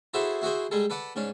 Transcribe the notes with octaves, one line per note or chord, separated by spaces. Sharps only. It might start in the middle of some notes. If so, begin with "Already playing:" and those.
E4 F#4 G#4 A4 C5 E5
E4 F#4 G#4 C5
G3 G#3 G#4 A4
A4 B4 D5 F#5
G#2 C#4 D4